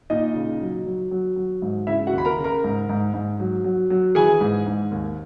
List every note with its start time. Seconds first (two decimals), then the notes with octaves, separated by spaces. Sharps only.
0.10 A#2 D#4 D#5
0.35 C#3
0.61 F#3
0.86 F#3
1.11 F#3
1.36 F#3
1.62 G#2
1.87 C#3 E4 E5
2.07 F#4 F#5
2.13 D#2 B5
2.25 A#4 A#5
2.38 C#3
2.44 A#4 A#5
2.64 G#2
2.89 G#2
3.14 G#2
3.40 F#3
3.64 F#3
3.90 F#3
4.15 E3 G#4 G#5
4.41 G#2
4.66 G#2
4.91 D#2